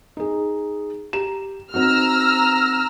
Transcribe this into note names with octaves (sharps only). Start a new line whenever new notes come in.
D#4 G#4
G4 A#5 E7
C4 D#4 F#4 A#5 E6 F6